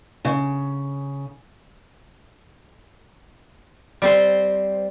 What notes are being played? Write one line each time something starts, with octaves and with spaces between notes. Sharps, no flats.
C#3
G3 C4 C5